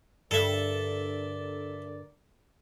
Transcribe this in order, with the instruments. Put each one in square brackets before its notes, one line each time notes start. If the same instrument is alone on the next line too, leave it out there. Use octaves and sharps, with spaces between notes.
[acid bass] G2 [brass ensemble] D3 A#4 D5 [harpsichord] A4 E5